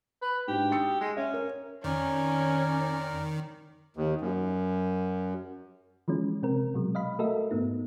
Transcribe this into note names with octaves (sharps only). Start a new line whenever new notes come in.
B4
G#2 D4 F#4 G4
D#6 E6 C#7
G#3
C#4 E5
A#4
F2 D#3 C#4 A#4 D5 F6
D#2
F#2
E3 F3 G#3 C#4
C3 C4 A#4
B2 F#3 G#3
D#5 F5 B5
A3 F#4 A4 A#4 D#5 E5
G#2 A3 B3 D#4